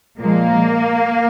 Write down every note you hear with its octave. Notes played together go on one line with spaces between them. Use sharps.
A#2 F3 G#3 A#3